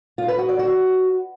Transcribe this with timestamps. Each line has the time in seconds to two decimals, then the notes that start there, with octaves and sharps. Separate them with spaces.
0.18 F4
0.28 B4
0.39 F#4
0.49 D5
0.59 F#4